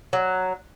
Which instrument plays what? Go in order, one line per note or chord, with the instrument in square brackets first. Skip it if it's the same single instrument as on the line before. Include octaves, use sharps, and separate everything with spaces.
[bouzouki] F#3